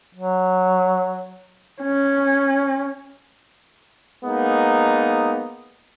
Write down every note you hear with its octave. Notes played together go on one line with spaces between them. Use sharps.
F#3
C#4
G#3 A#3 B3 D#4